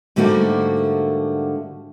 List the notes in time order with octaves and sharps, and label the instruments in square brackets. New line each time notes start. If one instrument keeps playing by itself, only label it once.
[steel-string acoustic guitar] G#2 D3 G3 A3 A#3 F#4